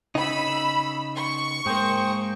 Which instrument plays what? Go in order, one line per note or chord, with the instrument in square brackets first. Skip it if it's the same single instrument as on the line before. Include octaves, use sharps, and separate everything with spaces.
[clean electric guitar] C#3 D#4 [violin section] B5 E6
[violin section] C#6
[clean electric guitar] G#2 A#3 [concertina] C5 G5 D#6